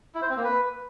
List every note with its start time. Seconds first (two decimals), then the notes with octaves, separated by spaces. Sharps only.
0.15 E4
0.22 C5
0.29 C4
0.37 A#3
0.44 B4